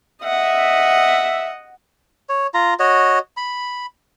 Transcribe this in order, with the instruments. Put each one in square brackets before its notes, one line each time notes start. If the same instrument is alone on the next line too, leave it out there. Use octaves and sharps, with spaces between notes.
[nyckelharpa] D#5 F#5 [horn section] E5
[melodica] C#5
F4 A#5
F#4 C#5 D#5
B5